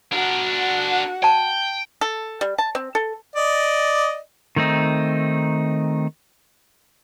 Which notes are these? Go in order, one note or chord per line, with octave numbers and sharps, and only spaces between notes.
D4 F#4 A#4 F#5
D5 G5 A5
A4
G3
A5
C4
A4
D5 D#5
D#3 A3 C4 D#4